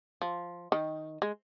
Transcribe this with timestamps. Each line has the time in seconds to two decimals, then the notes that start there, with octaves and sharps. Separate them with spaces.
0.22 F3
0.72 D#3
1.22 G#3